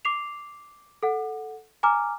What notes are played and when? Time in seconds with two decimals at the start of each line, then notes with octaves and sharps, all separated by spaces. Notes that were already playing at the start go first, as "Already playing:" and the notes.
0.05 D6 C7 F7
1.03 A4 F#5
1.83 G#5 A#5 D6 F6